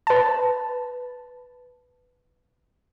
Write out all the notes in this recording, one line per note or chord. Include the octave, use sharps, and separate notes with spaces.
B4 A5